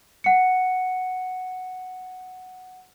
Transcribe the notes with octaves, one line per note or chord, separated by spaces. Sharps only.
F#5 C#7